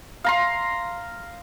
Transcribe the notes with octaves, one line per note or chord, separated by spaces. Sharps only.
F5 A#5 C6